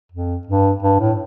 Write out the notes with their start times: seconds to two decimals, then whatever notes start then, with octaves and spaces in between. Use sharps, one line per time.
0.12 F2
0.47 G2
0.83 G2
1.00 A2